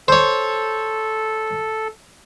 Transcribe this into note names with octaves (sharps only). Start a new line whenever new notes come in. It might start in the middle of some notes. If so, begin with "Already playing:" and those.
A4 C5 C#5